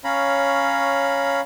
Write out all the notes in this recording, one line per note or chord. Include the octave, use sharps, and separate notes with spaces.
C#4 C#5 F5 A#5 B5